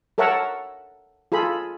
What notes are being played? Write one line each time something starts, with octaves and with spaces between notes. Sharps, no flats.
A4 A#4 C#5 E5 F#5 A5
F4 G#4 A4 B5